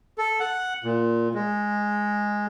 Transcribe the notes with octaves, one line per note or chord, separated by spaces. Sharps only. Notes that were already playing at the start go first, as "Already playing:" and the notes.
A4
F#5
A#2
G#3